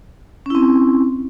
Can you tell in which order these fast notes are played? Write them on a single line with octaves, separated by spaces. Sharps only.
C#4 E4 C4